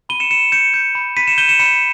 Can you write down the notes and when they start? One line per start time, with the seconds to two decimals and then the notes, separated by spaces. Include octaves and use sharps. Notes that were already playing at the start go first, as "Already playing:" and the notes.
0.09 B5 D#7 G7
0.20 C#7 E7
0.31 B5 C#7 E7
0.52 G6 C#7 E7
0.74 G6
0.95 B5
1.17 B5 B6 D#7
1.27 C#7 E7
1.38 G6 D#7 G7
1.49 C#7 E7
1.59 B5 C#7 E7